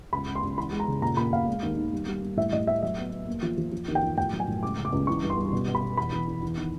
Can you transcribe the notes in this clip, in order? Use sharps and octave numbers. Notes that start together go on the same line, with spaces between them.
C#2 B5
C#2
C6
C#2
E3 B5
G#3
A#5
C#3
A#2 A#5
A#2 B5
A#2 F5
G#3
D#2
D#3
G3
G3
G3
A2 E5
A2 D#5
A3 E5
F#3 E5
B3
B3
A#3
F3
F3
F3
D#2
G5
F3
A2 G5
F#3
G#5
A2
C#2 D6
C#3
D6
C#2
E3 C#6
G2
C6
G3
B2
B2
B5
B2
E2 B5
E2
E3
E2
D#3